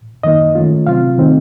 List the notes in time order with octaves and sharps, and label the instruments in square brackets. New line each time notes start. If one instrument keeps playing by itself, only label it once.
[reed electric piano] F#2 D#3 A#3 D#4 D#5
D#3 A3 C#4 F4
C3 F#3 C4 F4 F5
D#3 A3 C4 D#4